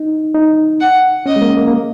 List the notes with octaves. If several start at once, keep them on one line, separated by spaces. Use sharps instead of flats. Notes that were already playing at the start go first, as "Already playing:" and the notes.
Already playing: D#4
D#4
F#5
C#4 D#5
G#3
A#3
A#3
A#3
G#3